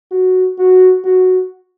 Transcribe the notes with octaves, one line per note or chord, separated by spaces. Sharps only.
F#4
F#4
F#4